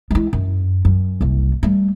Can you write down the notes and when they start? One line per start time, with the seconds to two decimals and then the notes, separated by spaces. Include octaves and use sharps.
0.11 G#3 E4
0.33 F#2
0.85 F#2
1.21 F#1 C2
1.63 G3 A3